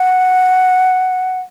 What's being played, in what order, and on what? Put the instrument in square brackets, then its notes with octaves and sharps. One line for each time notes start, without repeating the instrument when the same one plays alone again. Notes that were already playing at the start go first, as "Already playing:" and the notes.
Already playing: [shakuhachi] F#5